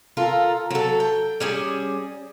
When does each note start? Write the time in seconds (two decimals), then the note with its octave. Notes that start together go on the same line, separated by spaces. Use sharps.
0.17 F4 A4 A#4
0.71 F#3 A4
1.00 G5
1.40 G3 C#4 G#4